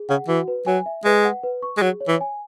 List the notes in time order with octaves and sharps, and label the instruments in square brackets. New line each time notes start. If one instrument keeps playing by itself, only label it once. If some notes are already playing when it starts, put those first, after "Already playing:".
Already playing: [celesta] G#4
[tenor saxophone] C#3 [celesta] F#5
[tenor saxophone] E3 [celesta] F#4
[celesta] B4
[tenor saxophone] F#3 [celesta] G#5
[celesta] E5
[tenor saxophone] G#3 [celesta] B4
[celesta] F#5
B4
C#6
[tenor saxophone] G#3
[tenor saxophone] F#3 [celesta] G#4
[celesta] C#5
[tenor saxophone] E3
[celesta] G#5